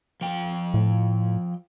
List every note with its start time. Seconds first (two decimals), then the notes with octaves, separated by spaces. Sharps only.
0.21 F3 G5
0.74 A2